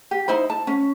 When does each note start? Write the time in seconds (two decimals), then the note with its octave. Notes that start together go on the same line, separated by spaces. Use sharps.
0.11 G4
0.28 D#4 E4 C5 B5
0.50 A5
0.67 C#4